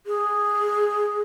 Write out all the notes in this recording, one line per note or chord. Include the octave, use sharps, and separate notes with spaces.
G#4